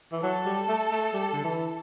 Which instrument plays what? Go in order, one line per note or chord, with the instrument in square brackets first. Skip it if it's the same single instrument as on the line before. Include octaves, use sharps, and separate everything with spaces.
[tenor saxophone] E3
[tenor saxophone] F#3 [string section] A4
[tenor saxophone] G3
A3
A3
G3
D3
E3